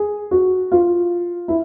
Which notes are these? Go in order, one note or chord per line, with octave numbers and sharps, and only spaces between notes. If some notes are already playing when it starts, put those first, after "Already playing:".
Already playing: G#4
F#4
F4
E4